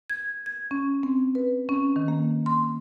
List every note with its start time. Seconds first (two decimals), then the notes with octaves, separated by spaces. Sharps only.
0.10 G#6
0.46 G#6
0.71 C#4
1.03 C4
1.35 B4
1.69 C#4
1.96 D#3
2.08 A#3
2.46 C6